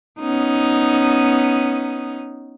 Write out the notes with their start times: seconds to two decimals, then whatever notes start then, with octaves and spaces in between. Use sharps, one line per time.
0.20 B3 C#4 D#4